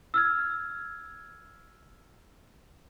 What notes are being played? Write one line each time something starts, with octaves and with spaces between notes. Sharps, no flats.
E6 F6 G#6